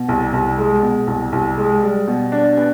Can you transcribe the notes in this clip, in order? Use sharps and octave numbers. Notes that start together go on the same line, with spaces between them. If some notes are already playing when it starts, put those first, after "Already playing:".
Already playing: B2
C2
C2
G#3
B2
C2
C2
G#3
G3
B2
D4
B3